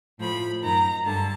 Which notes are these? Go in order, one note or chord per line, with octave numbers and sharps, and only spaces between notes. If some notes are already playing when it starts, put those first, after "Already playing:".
A2 F3 B5
F#2 D#3 A#5
G2 D3 A5